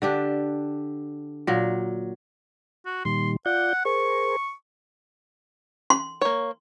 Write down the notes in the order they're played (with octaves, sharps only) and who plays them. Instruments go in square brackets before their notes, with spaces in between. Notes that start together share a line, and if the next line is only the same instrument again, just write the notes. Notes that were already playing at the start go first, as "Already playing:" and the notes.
[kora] D3 D4 G4
A#2 F#3
[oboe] F#4
[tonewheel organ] A#2 D#3 G3 [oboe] C6
[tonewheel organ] F4 D5 G6 [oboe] F#5
[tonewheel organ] G#4 A#4 C5 [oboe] C#6
[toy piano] C6
[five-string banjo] A#3 C#5